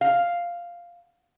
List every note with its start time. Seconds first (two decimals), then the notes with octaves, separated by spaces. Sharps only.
0.01 F5